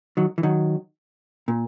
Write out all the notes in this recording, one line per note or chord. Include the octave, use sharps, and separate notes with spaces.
D#3 F#3
E3
D#3 F#3
A#2